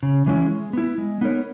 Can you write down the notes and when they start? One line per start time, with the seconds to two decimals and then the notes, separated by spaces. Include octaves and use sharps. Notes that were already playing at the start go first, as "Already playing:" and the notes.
0.03 C#3
0.26 E3 G#3 C#4 E4
0.50 G#3
0.73 B3 E4
0.98 G#3
1.21 B3 D#4 A#4 C#5